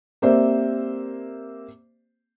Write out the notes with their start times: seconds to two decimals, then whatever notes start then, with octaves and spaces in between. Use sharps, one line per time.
0.22 A#3 C4 G4 C5 D5 E5